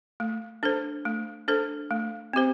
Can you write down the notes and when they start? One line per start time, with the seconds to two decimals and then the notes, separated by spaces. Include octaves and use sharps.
0.20 A3
0.63 D4 A4 C5
1.05 A3
1.48 D4 A4 C5
1.91 A3
2.33 C4 G4 C5